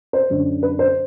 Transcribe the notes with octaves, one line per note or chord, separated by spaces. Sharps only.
C5
F#2 D3
B4
C5